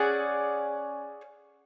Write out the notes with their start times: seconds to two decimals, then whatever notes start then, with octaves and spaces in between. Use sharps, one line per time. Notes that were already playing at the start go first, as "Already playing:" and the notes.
Already playing: C#4 G#4 D5 F#5